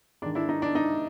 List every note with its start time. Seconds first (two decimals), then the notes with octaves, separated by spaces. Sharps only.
0.22 G#2 D#3 D4
0.35 D4 E4
0.49 D#4
0.62 D4
0.75 D#4